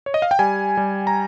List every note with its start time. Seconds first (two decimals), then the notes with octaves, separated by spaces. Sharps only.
0.06 C#5
0.14 D#5
0.22 F5
0.31 G5
0.39 G3 G#5
0.77 G3
1.07 A#5